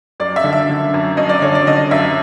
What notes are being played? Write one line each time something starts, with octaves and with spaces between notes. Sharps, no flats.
F#2 D5
E5
D3
E5
D3
F#2
F#2 D#5
D5
D3 C#5
D5
D3 D#5
F#2 E5